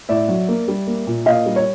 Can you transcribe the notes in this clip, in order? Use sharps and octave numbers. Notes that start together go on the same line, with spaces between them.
A2 D5 E5
F#3
A#3
G3
A#3
A#2
A#2 D#5 F5
G3
C#5